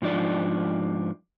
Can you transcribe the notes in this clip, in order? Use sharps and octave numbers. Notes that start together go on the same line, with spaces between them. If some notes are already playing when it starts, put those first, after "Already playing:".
G#2 F3 D4 D5